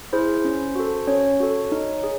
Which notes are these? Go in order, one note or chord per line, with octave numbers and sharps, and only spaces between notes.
E4 G#4 C5
C#4
F#4 A4
C#4 C#5
F#4 A4
D#4
G#4